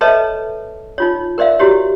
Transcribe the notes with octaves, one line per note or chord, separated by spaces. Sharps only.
A4 B4 C#5 D#5 E5 A5
D#4 F4 C#5
A#4 C5 D5 E5 F5
E4 F#4 G4 C#5